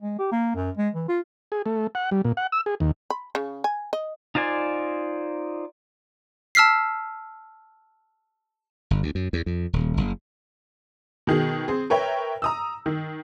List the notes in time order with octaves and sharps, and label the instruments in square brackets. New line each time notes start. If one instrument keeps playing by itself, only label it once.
[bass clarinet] G#3
G4
A#3
F#2
G#3
E3
F4
[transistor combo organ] G#4
A3
F#5
G3
A#2
F#5
E6
G#4
D#2
[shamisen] B5
C#3
G#5
D#5
[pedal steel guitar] D#4 F4 C5 D5 G#5
[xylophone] A5 E6 F6 B6 C7
[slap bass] G1
D2
F#2
E2
F2
D#1
F#1
[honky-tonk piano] B2 D#3 G#4
C4 G#4
A#4 B4 C#5 E5 G5
A#5 D#6 E6
D#3